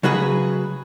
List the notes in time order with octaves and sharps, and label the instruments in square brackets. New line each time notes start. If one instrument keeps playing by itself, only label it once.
[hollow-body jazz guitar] C#3 F#3 F#4 G#4 B4